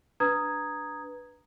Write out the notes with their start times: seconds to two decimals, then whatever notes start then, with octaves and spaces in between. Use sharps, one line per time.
0.20 D4 B4 A#5 D#6 G#6